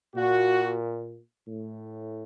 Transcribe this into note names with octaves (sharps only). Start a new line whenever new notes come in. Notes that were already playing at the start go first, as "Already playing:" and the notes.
A#2 F#4
A2